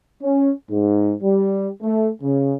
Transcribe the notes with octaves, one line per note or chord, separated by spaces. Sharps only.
C#4
G#2
G3
A3
C#3